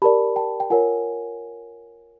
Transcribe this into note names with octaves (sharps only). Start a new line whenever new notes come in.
G4 A#4 D5 A5 B5
G5 A5
G5
F4 A#4 C#5 F#5 G#5